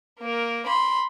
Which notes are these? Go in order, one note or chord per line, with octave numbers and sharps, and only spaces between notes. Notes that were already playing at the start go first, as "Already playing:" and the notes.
A#3 A#4
B5 C6